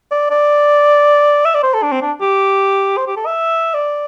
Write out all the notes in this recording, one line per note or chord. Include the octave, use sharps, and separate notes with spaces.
D5
D5
E5
D5
C5
A4
D4
C4
D4
G4
C5
G4
A4
E5
D5